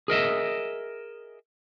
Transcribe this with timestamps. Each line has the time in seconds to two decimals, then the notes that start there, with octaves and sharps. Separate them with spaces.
0.08 G#4 A#4 D#5 E5